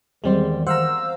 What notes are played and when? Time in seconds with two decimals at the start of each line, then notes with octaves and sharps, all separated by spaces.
0.24 E2 D#3 E3 G3 G#3 C4 C5
0.67 C5 F5 F#5 A#5 E6